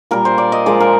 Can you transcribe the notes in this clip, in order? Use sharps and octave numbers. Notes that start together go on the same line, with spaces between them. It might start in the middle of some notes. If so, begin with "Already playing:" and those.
A#2 G3 A#4
C5
D5
D#5
A#2 F3 G#3 D5
A#4